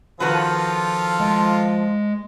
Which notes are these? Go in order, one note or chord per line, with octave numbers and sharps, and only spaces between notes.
D#3 F3 F4 F#4 A4 B4
G#3